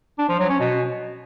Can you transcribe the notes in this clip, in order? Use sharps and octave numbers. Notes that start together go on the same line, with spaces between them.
D4
F3
F#3
C#4
B2